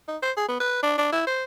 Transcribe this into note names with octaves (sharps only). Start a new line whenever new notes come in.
D#4
C5
G#4
B3
B4
D4
D4
E4
C5